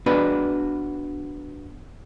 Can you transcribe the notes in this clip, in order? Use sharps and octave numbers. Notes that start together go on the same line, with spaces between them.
B3 D4 F#4 B4